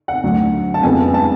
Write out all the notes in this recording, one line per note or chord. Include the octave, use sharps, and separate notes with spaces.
F#5
D2 D3 F#3
A5
F2 C#3 G#3 B3 G#5
A5